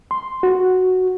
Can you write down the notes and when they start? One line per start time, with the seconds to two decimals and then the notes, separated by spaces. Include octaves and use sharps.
0.11 C6
0.43 F#4